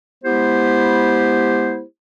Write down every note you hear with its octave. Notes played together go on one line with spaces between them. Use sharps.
G#3 B3 E4 G4 C5